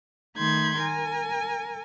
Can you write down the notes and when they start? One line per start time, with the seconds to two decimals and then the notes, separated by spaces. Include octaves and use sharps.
0.37 D#3 A3 B5 C6 G6 G#6
0.79 A#4 G#5